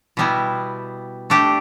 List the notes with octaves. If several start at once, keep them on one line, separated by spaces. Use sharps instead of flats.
B2 G3 B3 E4
A3 D4 G4